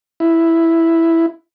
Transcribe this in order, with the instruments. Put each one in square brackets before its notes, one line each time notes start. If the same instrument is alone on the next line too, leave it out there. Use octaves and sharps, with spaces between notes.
[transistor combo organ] E4